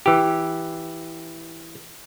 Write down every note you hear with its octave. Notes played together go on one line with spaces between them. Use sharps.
E3 G4